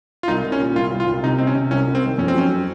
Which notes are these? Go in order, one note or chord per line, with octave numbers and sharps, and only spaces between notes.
F4
C2 D#4
C2
C#4
A#2
C2 F4
C2
F4
C2
C3 D#4
C3 C4
C#4
C3
C2 C#4
C2
C4
D#3
F2 C#4
C4
F#3 C#4